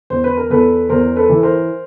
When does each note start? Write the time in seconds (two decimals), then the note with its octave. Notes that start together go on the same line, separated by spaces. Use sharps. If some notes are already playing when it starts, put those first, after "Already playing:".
0.10 E2 C5
0.24 B4
0.37 A#4
0.50 E2 A4 B4
0.89 E2 A#4 C5
1.16 A4 B4
1.29 E3
1.43 A#4 C5